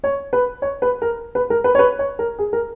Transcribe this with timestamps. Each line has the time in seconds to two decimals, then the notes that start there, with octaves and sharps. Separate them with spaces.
0.04 C#5
0.33 B4
0.62 C#5
0.82 B4
1.02 A#4
1.35 B4
1.50 A#4
1.64 B4
1.75 C#5
1.79 B4
1.99 C#5
2.19 A#4
2.39 G#4
2.53 A#4